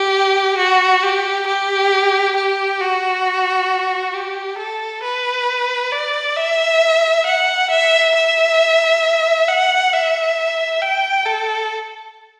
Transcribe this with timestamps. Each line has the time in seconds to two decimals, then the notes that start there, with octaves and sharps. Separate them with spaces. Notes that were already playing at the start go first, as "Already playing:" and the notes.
Already playing: G4
0.57 F#4
1.03 G4
1.47 G4
2.36 G4
2.80 F#4
4.14 G4
4.58 A4
5.03 B4
5.92 D5
6.36 E5
7.26 F#5
7.70 E5
8.15 E5
9.48 F#5
9.93 E5
10.82 G5
11.26 A4